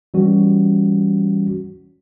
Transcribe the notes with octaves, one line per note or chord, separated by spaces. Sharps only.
E3 G3 C#4 F#4